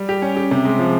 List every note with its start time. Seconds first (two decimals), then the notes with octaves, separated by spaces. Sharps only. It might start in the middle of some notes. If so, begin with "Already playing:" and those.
Already playing: G3
0.09 G4
0.22 C#4
0.36 G4
0.51 C3
0.65 G#3
0.79 F3